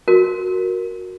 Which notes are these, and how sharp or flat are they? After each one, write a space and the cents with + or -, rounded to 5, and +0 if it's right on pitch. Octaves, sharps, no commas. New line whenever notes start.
F#4 -10 A#4 +0